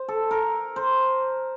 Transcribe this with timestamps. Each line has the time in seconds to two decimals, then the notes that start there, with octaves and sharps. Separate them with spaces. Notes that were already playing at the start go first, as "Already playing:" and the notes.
Already playing: C5
0.08 A4
0.31 A#4
0.76 C5